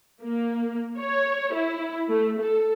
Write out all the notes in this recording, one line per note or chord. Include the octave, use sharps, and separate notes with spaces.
A#3
C#5
E4
A3
A4